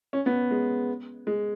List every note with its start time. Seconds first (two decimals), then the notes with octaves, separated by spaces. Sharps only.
0.13 C#4
0.26 B3
0.51 G#3
1.27 G#3